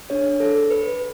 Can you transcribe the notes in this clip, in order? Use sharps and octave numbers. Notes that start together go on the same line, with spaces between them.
D4 G#4 C#5
A4
B4